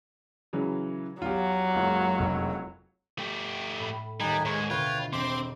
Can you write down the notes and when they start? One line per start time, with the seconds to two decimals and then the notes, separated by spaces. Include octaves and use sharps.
0.53 C#3 E3 F#3
1.22 E2 F#3 F4 G4
1.75 F#1 C#2
2.19 F1
3.19 A3 G4
3.79 A2 B5
4.20 D#1 G3 D#4 F#5 G#5
4.45 G#2 G#3 C#5 C#6
4.70 D2 B2 F4 B4 C#5 G5
5.13 E1 C4 C6 D6 G6 B6